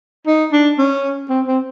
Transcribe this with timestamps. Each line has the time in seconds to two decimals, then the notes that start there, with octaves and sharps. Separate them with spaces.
0.27 D#4
0.52 D4
0.78 C#4
1.29 C4
1.47 C4